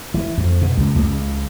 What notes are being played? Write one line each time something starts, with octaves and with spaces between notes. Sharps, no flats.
E3
F2
B2
C#2
C#2